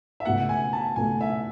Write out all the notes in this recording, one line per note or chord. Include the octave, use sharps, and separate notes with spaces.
E5
C#2 B2 A3 F#5
G#5
A5
C#2 B2 A3 G#5
E5